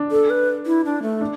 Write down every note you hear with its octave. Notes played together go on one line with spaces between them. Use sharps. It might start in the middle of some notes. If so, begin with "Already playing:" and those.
Already playing: D4
A4
B4
E4
D4
A3
D4